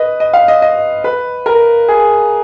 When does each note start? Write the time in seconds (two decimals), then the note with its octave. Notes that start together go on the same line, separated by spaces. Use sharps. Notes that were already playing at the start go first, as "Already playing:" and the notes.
Already playing: B4 D#5
0.20 D#5
0.33 F5
0.48 D#5
0.62 D#5
1.04 B4
1.46 A#4
1.88 G#4